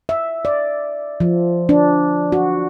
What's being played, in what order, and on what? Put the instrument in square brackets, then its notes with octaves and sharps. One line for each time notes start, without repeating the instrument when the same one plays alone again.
[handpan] E5
D5
F3
D4
F#4